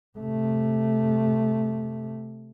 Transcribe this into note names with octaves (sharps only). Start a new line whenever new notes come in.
C3 A3